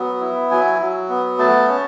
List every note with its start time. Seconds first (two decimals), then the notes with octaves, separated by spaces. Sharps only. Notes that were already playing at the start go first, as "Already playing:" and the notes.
Already playing: F#3 B3
0.21 E4
0.51 F#3 G#5
0.80 F#3
1.09 B3
1.39 A3 A5
1.68 C#4